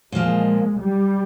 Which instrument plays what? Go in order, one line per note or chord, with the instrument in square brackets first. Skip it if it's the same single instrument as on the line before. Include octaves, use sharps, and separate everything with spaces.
[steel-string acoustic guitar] A#2 F3 A#3 [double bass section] G#3
[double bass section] G3